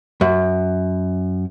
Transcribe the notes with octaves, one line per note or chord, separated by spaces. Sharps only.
F#2